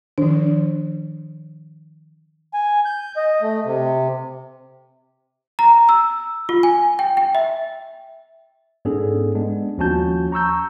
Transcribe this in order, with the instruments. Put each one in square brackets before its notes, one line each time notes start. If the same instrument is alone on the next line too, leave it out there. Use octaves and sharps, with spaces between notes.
[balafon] D#3 F3 [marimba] D4
[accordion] G#5
G6
D#5
A3
C3
[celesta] A#5
E6
F4
G#5
G5
G5
E5
[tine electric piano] G#2 B3 C#4 D4 G#4 A4
G#3 B3 D4
D#2 F3 C#4 F#4 A5 G6
A#5 C#6 E6 G6